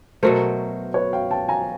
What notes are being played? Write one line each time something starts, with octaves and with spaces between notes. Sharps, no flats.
B2 F#3 A3 A#4 C5
B4 C#5
F5 G5
G5 A5
G#5 A#5